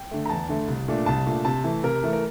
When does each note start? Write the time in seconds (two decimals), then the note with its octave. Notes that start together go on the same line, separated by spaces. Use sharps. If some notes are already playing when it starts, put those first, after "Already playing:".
Already playing: G5
0.11 D3 A3
0.26 A#5
0.29 E2 A5
0.49 D3 A3
0.68 C2
0.88 A#2 A3 D4
1.06 C2 A5
1.26 A#2 A3 D4
1.45 C3 A5
1.64 E3 A3
1.83 C3 A#4
2.03 E3 A3
2.13 A#4